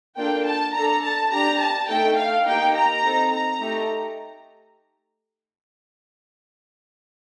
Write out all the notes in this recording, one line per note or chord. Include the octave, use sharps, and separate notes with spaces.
A#3 D4 F4 A4 G5
A5
D4 A4 A#5
A5
D4 G4 A#5
A5
A3 D#4 A4 G5
F5
A#3 D#4 G4 G5
A#5
C4 D#4 A4
A#5
A3 D#4 G4